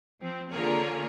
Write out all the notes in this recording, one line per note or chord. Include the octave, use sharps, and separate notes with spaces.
F3 C4
D3 A#3 F4 G#4 A#4 C#5